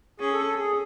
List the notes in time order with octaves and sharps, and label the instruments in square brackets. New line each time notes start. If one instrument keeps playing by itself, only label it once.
[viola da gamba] C#4 [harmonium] G#4
[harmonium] A4
A4
G#4